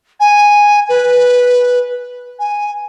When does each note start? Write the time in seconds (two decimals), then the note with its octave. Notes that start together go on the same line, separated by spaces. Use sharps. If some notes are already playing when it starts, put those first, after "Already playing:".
0.20 G#5
0.88 B4
2.39 G#5